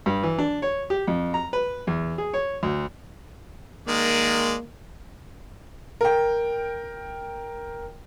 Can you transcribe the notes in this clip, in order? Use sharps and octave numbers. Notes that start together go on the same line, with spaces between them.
G2
E3
D4
C#5
G4
F2
A#5
B4
E2
G#4
C#5
D2
D#3 G#3 A#3 D5
A#4 G5